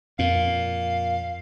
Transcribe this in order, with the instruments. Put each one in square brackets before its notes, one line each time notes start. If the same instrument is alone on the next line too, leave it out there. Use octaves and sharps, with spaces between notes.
[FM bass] F2 [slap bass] A#2 [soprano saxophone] F5